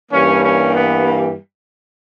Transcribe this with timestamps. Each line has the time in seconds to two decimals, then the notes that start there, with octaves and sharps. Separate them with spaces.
0.11 G2 E3 G3 A#3 C#4
0.43 C#4
0.74 B3